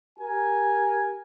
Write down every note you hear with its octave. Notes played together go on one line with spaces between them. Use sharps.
G4 A#4 G#5